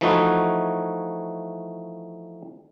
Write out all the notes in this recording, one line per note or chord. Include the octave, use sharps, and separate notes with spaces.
E3 F3 A3 D#4 E4 F#4